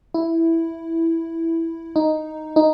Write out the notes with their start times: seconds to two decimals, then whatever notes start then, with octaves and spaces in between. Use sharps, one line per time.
0.14 E4
1.96 D#4
2.56 D#4